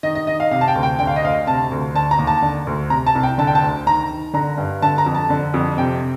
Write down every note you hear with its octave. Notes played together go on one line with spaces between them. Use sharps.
D#3 D#5
D#5
D#3 D#5
F5
C3 F5
A5
G5
D2
G5
D3 G5
F5
D#5
D2 F5
C3 A5
D2
D3 A5
A#5
D#2
A5
D3
D2
C3 A#5
A5
C2
G5
D3 A5
G5
A5
D2
D#3 A#5
D#3
D3 A#5
G2
D3 A5
A#5
F2
A5
D3
F2
C3 G5